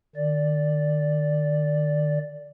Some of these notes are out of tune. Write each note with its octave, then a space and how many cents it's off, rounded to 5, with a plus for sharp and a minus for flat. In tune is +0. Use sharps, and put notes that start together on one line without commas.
D#3 -40 D5 +0